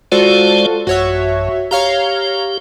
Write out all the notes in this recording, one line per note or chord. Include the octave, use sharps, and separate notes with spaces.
G#3 F4 F#4 A4 C5 D5
A1 F#2 F#4 C#5 E5
G4 C#5 F5 A#5